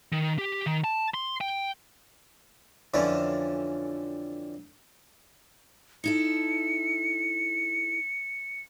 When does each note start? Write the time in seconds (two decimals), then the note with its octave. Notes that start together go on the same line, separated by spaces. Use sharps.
0.13 D#3
0.38 G4
0.66 D#3
0.84 A5
1.14 C6
1.41 G5
2.94 F2 D3 E3 C#4
6.04 D#4 E4 A4 C#7